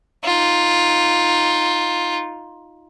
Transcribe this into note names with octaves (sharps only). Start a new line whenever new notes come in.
D#4 F4